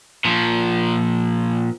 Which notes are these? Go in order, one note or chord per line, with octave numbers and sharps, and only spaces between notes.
A#2 F3